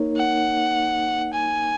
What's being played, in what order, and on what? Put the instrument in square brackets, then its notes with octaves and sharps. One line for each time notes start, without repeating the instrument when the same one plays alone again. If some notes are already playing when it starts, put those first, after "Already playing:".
Already playing: [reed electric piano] A#3 D#4 A#4 C#5
[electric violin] F#5
G#5